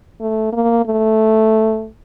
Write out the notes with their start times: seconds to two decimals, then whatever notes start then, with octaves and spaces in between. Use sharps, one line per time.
0.20 A3
0.52 A#3
0.85 A3